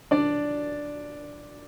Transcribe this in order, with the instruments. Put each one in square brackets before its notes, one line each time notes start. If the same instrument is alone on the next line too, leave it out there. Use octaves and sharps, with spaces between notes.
[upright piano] D4 D5